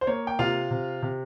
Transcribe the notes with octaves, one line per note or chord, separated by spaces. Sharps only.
C5
A#3 C#5
G5
C3 F4 F5
C3
C3